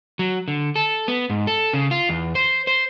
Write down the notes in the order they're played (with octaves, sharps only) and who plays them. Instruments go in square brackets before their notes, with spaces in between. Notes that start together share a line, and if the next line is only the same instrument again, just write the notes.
[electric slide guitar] F#3
D3
A4
B3
G#2
A4
C#3
F4
E2
C5
C5